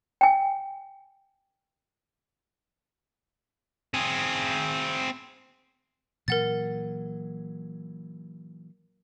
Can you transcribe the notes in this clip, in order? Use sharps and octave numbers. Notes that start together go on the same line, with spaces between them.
G5 G#5
C4 G#4
A#2 E3 F#3 A#4 F#5 A6